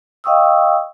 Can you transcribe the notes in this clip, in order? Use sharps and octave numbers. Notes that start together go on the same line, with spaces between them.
D#5 F5 G5 C#6 D#6 E6